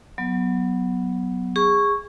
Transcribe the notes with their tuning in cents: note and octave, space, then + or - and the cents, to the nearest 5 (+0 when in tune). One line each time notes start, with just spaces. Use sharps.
F#3 +0 B3 +0
G#4 -25 C#6 +0